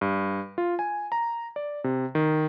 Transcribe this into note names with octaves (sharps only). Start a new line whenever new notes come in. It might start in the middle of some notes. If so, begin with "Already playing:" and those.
G2
F4
G#5
A#5
D5
C3
D#3